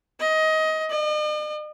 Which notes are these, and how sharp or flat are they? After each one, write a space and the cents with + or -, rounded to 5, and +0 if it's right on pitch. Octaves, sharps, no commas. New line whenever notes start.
D#5 +20
D#5 -45